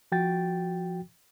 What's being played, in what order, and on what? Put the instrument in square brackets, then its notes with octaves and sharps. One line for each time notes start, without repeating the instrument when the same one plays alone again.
[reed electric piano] F3 F#4 G5 A6